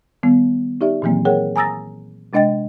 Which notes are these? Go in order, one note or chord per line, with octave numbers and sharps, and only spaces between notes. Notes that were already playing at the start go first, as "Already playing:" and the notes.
D#3 G3 B3
D#4 G4 D5 E5
A#2 D#3 E3 F#3 A#3 C4
G#4 A#4 C#5 F#5 G5
G#5 A#5 D#6 E6 A6 A#6
C3 G#3 D4 D#5 G5 A6